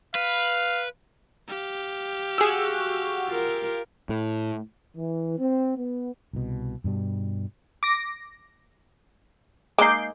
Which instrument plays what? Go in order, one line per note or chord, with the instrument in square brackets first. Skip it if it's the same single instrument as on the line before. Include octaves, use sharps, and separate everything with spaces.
[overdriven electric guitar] B4 [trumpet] F5
[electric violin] G4 F5
[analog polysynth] F#4 [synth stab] G#4 E6
[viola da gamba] F4 A#4
[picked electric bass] A2
[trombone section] E3
C4
B3
[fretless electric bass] C2 B2
G2 B2 G3
[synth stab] D6 A#6
[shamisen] G#3 A#3 D#4 [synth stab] D6 G6 C7